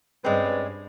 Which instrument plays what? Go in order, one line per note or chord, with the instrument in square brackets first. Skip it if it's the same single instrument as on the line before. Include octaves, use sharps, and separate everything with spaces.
[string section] G2 [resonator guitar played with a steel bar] G#3 C4 [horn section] C#4 B4 D5